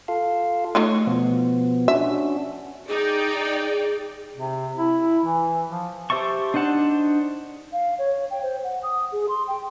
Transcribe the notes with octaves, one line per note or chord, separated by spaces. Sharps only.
F4 A4 F5
A3 D#4 F4 C#5 C#6
B2 F3 B3
C#4 D4 F#4 E5
D#4 G#4 D5 G5
C3
E4
E3
F3
G4 C5 E5 A5 C#6
D4 D#4 C5 F#5 A5
F5
C#5
G5
C5
F#5
D#6
G#4
C6
G5